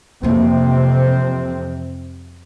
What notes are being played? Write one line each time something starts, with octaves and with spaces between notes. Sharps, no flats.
F2 C3 E3 A#3 C4